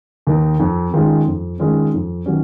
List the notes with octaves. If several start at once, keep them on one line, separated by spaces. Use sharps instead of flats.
D#2 D#3
F2
D#3 G#3 C#4 F4
F2
D#3 G#3 C#4 F4
F2
D#3 F#3 C#4